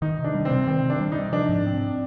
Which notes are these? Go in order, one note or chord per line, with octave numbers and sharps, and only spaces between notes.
D#3 D#4
C3
D4
G3
C4
C3
D#3 C4
C3
D4
G3
D#4
C3
F3 D4
G#2
C4